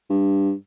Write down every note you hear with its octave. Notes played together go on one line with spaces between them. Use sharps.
G2